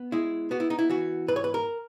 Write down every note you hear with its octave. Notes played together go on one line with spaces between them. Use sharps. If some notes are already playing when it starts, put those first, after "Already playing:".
Already playing: B3
G#3 E4
B3 F#4
E4
D#4
E4
E3 F#4
G#2 B4
C#5
B4
A#4